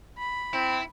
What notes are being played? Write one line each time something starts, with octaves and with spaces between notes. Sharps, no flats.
B5
C4 E4